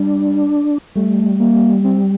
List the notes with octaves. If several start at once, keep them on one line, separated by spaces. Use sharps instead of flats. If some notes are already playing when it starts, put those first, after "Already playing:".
Already playing: G3 D4
G3 A3
A#3
C4